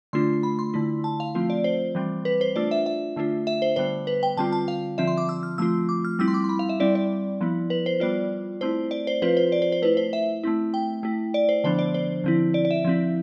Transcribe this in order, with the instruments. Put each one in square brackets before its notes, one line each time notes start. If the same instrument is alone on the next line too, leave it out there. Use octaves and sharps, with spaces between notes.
[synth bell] D3 A3 D4 F4 C6
B5
C6
D3 A3 E4
A5
F5
F3 A3 C4 F4
D5
C5
E3 G3 C4
B4
C5
A3 D4 F4 D5
E5
E5
D3 A3 D4 F4
E5
C5
D3 G3 B3 C5
B4
G5
D3 G3 C4 F4 A5
A5
F5
D3 F3 C4 F4 E5
C6
D6
E6
F6
F3 A3 C4 F4 E6
D6
F6
G3 C4 E4 E6
C6
D6
C6
B5
F5
E5
G3 C4 E4 D5
D5
F3 B3 E4
B4
C5
G3 B3 F4 D5
A3 C4 E4 C5
D5
C5
F3 C4 F4 B4
C5
D5
C5
C5
A3 E4 B4
C5
E5
A3 C4 E4
G5
A3 E4
D5
C5
D3 F3 B3 D4 C5
D5
C5
D3 F3 C4 E4
D5
D5
E5
F3 C4 E4